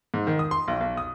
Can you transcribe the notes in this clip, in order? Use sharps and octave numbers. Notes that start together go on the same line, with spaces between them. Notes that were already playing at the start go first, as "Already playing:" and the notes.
G#2
D#3
D#6
C6
B1
B1
D#6